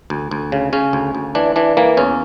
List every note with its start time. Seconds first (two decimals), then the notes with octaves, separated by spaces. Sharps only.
0.10 D2
0.31 D2
0.52 C#3
0.73 C#3 C#4
0.93 D2
1.15 D2
1.35 E3 D4
1.56 E3 D4
1.77 E3 A#3
1.97 E2 C#4